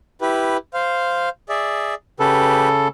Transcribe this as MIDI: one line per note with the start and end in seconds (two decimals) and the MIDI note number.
0.21 0.57 64
0.21 0.57 67
0.21 0.57 71
0.74 1.29 72
0.74 1.29 77
1.49 1.94 68
1.49 1.94 74
1.49 1.94 76
2.20 2.88 49
2.20 2.69 67
2.20 2.88 69
2.20 2.69 71